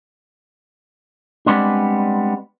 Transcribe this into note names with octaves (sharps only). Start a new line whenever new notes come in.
G3 G#3 B3 C4 D4